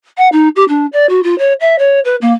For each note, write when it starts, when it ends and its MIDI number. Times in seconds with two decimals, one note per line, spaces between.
0.18 0.28 78
0.32 0.48 63
0.56 0.64 67
0.69 0.86 62
0.93 1.07 74
1.09 1.20 66
1.23 1.37 65
1.38 1.53 73
1.60 1.76 76
1.79 2.00 73
2.05 2.16 71
2.21 2.32 58